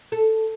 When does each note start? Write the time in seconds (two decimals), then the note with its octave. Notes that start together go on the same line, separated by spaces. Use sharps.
0.12 A4